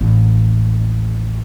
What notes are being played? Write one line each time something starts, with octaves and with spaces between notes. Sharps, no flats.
A1 D#2